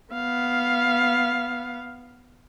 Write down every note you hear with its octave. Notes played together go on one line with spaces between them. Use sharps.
B3 F5